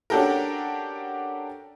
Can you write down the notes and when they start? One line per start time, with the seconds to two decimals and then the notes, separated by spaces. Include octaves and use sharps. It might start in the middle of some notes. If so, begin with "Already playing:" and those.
0.10 C#4 D4 F#4 G4 A4 A#4